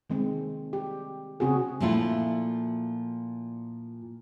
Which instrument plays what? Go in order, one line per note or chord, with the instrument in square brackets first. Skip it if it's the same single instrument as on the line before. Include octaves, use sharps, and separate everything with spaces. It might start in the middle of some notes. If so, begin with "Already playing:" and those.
[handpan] D#3 G#3 C4
G4
C#3 C4 F#4 G#4
[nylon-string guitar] A#2 F3 A3 E4 F4